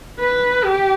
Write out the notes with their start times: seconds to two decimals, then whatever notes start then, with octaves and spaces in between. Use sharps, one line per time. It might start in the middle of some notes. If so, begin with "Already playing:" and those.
0.20 B4
0.64 G4